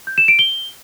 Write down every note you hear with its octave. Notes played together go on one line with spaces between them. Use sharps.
G6
E7
D7
G7